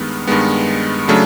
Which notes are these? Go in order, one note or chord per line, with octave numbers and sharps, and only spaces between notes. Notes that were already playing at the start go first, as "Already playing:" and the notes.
Already playing: G2 D#3 G#3 B3
G2 D#3 G#3 B3
C#3 F#3 A3 D4